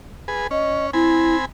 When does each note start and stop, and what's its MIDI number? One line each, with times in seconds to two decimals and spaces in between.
0.28 0.47 68
0.28 0.47 71
0.51 0.91 61
0.51 0.86 75
0.93 1.45 60
0.93 1.36 64
0.93 1.45 80
0.93 1.45 83